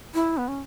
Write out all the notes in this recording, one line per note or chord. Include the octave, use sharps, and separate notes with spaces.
E4
B3
C#4